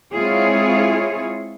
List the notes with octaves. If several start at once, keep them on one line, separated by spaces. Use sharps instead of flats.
G#3 C4 E4 F4 G#4 C#5